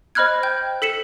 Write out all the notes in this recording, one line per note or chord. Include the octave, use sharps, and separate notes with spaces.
C5 D#5 B5 F6 F#6 G#6
G5 G6
A4 B6 C#7 E7